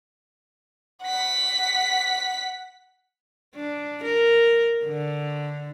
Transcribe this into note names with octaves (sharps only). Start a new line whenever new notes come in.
F#5 B6
D4
A#4
D3